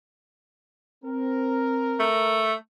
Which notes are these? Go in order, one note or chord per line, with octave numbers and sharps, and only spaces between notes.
C4 A#4
A3